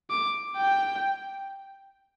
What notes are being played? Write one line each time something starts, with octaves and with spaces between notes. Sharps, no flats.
D6
G5